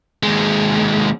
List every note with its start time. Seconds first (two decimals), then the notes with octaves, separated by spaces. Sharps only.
0.23 D#2 G#3